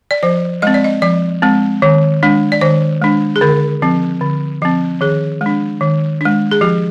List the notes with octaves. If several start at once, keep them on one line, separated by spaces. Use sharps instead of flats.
D5
F3 C5
G#3 C4 D#5
D5
D#5
F3 D5
G#3 C4
D#3
G#3 D4
D5
D#3 C5
G#3 D4
G#4
D3 A#4
F3 C4
D3
F3 C4
D#3 G#4
G#3 D4
D#3
G#3 D4
G#4
F3 G4